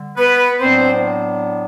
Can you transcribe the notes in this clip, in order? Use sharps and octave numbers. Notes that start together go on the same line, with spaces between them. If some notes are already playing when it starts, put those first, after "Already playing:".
Already playing: D3 G3
B3 B4
A2 F#3 B3 C4 D4 C5